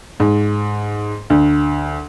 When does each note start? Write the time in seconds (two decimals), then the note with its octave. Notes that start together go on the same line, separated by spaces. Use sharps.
0.20 G#2
1.30 D2